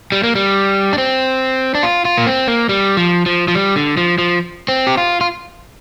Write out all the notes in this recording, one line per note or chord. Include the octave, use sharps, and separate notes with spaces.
G3
A#3
G3
D4
C4
D4
F4
F4
A#3
C4
A#3
G3
F3
F3
F3
G3
D3
F3
F3
C4
G4
F4
F4